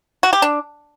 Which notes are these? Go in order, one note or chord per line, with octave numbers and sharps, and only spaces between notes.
F#4
G4
D4